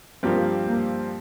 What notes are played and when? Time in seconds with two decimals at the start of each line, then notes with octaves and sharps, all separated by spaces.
0.23 G2 F3 A#3 C4 G4
0.67 A#3